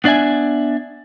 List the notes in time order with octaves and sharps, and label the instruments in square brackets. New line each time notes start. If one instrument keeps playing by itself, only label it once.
[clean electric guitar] B3 D4 D5 E5 G#5